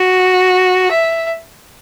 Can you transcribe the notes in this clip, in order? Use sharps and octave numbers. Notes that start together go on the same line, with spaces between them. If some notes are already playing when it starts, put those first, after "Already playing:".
Already playing: F#4
E5